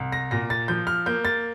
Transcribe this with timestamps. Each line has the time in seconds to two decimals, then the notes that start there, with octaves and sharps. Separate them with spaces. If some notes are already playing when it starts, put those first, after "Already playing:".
Already playing: C2
0.12 A#6
0.31 A#2 A#6
0.50 A6
0.68 F3 G6
0.87 F6
1.06 A#3 G6
1.25 A6